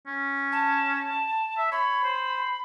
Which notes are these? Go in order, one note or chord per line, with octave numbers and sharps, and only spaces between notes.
C#4
A5
E5
C#5 B5
C5